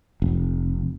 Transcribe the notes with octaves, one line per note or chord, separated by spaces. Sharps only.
F1